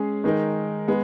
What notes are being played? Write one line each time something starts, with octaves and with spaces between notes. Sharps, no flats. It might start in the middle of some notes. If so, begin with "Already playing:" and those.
Already playing: G#3 C#4 G#4
D#3 G#3 D#4 A#4
G#3 B3